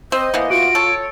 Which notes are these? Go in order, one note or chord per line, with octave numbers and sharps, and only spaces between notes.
C4 C5 D#5
E3 A#3 B3
F4 F#4 D7
A4 C#5